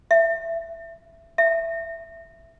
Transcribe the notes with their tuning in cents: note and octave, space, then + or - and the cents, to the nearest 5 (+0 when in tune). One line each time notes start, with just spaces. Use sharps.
E5 +15
E5 +10